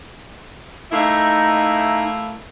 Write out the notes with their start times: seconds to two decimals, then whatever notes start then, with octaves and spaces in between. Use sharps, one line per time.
0.91 A3 A#3 D#4 E4